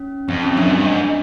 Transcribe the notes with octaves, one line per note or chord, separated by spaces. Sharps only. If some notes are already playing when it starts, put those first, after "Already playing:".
Already playing: C#4
F2 C4
C#4
F2
F#2 D4
G2
G#2